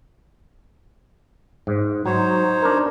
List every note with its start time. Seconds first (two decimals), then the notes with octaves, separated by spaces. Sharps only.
1.67 G#2
2.06 F#3 D#4 C5 C#5
2.62 D4 A#4